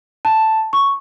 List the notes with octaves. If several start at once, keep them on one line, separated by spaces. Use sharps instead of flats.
A5
C#6